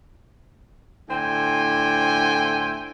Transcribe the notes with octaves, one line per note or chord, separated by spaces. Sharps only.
A2 D3 C5 G5 G#5